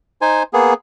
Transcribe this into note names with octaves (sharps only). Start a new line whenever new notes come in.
D#4 C5 G#5
A#3 B3 G#4